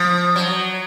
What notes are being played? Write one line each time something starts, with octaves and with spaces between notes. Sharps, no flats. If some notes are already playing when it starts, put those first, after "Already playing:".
Already playing: F3
F#3